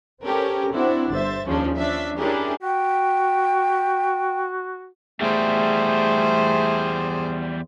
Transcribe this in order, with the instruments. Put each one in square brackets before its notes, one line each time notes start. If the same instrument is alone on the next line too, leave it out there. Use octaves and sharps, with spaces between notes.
[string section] C4 C#4 G4 A4 A#4
C4 D4 E4 F#4
G1 C5 E5 A6
D#2 C#3 F3 C#4 D4
F3 C#4 D4 E5
C#4 D4 E4 G4 G#4 A#4
[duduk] F#4 [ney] G5
[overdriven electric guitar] E2 G3 [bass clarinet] A3 [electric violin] G#4 C5